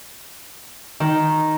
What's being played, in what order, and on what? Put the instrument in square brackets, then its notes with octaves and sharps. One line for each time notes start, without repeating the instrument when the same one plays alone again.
[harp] D#3